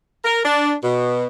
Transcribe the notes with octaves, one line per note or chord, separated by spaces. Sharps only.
A#4
D4
B2